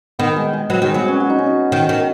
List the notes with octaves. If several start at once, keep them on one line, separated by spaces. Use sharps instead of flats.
D#3 B3
G#3
G#3
F#3 B4
D#3 G#4
F#3 B3
C#4
F#4
D#4
C#4
D#4
D#3
D#3